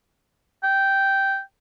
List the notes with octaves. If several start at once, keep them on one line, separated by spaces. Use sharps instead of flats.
G5